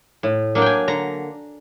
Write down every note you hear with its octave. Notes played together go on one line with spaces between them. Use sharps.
A2
F#3 A#3 D4
G5 G#5
D3 A#5